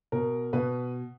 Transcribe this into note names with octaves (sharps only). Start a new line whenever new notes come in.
B2 A#4
B2 B4